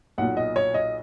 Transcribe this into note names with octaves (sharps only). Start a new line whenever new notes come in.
B1 A#2 F#5
D#5
C#5
D#5